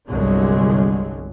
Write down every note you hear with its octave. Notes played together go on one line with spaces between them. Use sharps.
G1 C2 D3 F#3 G#3